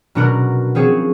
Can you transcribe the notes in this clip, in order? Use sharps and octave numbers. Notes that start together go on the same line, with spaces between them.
B2 F#3 D4 F#4 A#4
F3 C4 G#4 C#5